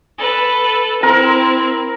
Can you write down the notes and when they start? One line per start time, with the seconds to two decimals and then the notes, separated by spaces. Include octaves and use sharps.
0.19 A4 B4
1.03 C4 E4 A#4